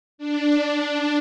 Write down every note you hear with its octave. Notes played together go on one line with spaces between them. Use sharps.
D4